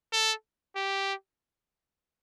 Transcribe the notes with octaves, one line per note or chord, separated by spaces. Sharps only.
A4
G4